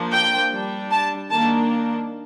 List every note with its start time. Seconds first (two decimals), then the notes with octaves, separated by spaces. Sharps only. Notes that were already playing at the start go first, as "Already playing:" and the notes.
Already playing: F3 A#3 D4
0.13 G5
0.53 G3 D4
0.91 A5
1.31 D#3 A#3 D4 A5